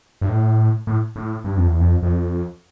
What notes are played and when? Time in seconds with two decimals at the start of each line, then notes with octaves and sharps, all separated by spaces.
0.21 G2
0.29 A2
0.87 A2
1.16 A2
1.44 G2
1.57 F2
1.67 E2
1.80 F2
2.03 F2